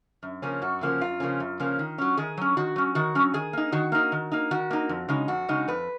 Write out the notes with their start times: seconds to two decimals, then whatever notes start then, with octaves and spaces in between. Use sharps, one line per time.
0.23 F#2
0.42 C#3 F3 A#3 C#4
0.62 F#2 F#4
0.81 C#3 F3 A#3 C#4
1.01 F#2 F4
1.20 C#3 F3 A#3 C#4
1.40 F#2
1.60 C#3 F3 A#3 C#4
1.79 D#3
1.98 F#3 C#4
2.17 D#3 G#4
2.37 F#3 C#4
2.57 D#3 F#4
2.76 F#3 C#4
2.95 D#3 F#4
3.15 F#3 C#4
3.34 D#3 G#4
3.53 A#3 D#4
3.72 D#3 F#4
3.92 A#3 D#4
4.12 D#3
4.32 A#3 D#4
4.51 D#3 F#4
4.71 A#3 D#4
4.89 F2
5.09 C#3 G#3 D#4
5.28 F2 F#4
5.48 C#3 G#3 D#4
5.68 F2 B4